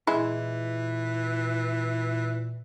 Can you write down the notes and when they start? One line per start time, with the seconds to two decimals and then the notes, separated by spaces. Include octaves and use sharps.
0.07 A#2 E3 G#3 E4